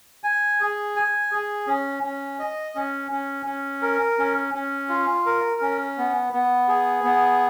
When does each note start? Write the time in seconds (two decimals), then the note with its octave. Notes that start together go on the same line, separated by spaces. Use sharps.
0.24 G#5
0.60 G#4
0.96 G#5
1.31 G#4
1.67 C#4
2.03 C#4
2.39 D#5
2.75 C#4
3.11 C#4
3.46 C#4
3.82 A#4
4.18 C#4
4.54 C#4
4.89 F4
5.26 A#4
5.61 C#4
5.98 B3
6.33 B3
6.68 G#4
7.04 B3